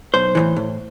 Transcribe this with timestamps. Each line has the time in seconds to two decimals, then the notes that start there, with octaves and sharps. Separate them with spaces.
0.14 B1 C5
0.35 A2 E3
0.56 A2